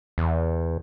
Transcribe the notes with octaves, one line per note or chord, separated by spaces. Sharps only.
E2